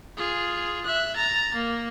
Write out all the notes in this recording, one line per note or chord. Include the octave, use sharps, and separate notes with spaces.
F4 G#4
E5 F#6
A#5 A6
A#3